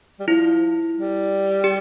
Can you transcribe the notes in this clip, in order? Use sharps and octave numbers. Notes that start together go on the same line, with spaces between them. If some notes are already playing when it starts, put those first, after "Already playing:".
G3
F3 E4
G3
G4